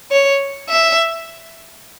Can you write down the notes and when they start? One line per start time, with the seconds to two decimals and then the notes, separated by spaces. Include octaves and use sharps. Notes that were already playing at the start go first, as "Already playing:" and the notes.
0.11 C#5
0.69 E5